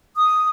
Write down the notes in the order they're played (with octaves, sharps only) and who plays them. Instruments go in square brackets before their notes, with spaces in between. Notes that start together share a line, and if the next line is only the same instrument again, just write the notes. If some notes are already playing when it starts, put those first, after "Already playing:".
[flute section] D#6